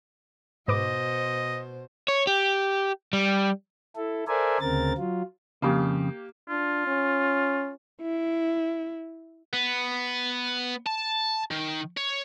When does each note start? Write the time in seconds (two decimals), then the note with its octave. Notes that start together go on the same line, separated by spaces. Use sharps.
0.68 G#2 B2 B4 C5 D#5 D6
2.08 C#5
2.27 G4
3.13 G3
3.96 E4 A4
4.28 A4 A#4 C5 D5 E5 G#5
4.61 D2 C#3 C4 A#4 A6
4.98 F#3 F4
5.62 F2 C#3 A#3 G4
6.49 D4 F4
6.87 C#4
8.02 E4
9.53 B3
10.86 A5
11.51 D#3
11.97 C#5